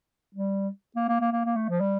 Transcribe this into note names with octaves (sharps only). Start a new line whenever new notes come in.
G3
A#3
A#3
A#3
A#3
A#3
A3
F3
G3